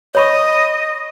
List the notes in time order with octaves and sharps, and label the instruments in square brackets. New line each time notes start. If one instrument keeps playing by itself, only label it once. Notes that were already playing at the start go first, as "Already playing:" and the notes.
[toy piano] C#5 B5 C#6 [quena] D#5